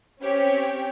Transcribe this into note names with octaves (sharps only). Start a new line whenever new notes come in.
C4 C#4 G4 C#5